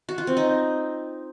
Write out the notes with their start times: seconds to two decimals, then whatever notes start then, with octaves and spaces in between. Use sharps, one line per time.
0.09 F#4
0.18 F4
0.27 C4
0.37 D#4